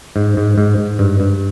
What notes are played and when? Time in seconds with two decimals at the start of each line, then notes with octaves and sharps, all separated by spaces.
0.16 G#2
0.37 G#2
0.58 G#2
0.78 G#2
0.99 G2
1.20 G2